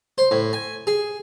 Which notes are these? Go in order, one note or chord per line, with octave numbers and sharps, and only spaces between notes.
C5
A2
G#5
G#4